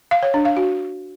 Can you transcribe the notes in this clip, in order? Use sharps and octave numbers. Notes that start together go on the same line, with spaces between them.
F5
C#5
D4
F5
F#4